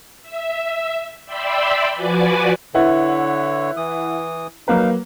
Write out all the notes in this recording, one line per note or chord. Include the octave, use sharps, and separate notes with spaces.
E5
D5 E5 G5 B5 C6 E6
F3 F#4 B4 D5 G#5 D6
D3 E4 B4 C#5 F#5
E3 D#6
F#3 A#3 D#4 B4 F5